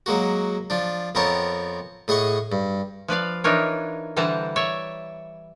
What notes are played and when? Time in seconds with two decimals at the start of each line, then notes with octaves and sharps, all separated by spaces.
0.06 F#3 G#3 A#3 F#4
0.70 F3 D4
1.15 F2 B3 C4 A#4 C#5 A5
2.08 A2 G#4 D#5 F#5 C#6
2.52 G2
3.08 F3 B4 D5 F5
3.44 E3 D4 D#4 F4 A#4 C#5
4.16 D3 E3 G3 C5 A5 A#5
4.56 C#5 D5 E5